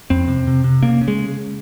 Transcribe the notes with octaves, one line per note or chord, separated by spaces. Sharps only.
F2 C4
C3
C3
C3
C#3 A#3
C#3
G#3